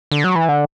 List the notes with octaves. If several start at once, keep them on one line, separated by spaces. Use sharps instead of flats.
D3
F#3
E3
D3